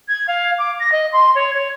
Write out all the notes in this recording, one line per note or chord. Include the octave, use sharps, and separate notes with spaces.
G#6
F5
D6
A#6
D#5
C6
C#5
C#5